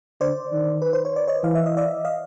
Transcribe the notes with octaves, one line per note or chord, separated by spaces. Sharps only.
D3 C5 D5
D#3
B4
C5
C#5
D5
C#5 D#5
E3 F5
E5
D#5
D5 E5
D#5 F5